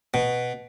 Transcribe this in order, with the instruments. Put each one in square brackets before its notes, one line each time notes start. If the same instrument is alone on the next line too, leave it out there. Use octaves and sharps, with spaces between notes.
[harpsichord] B2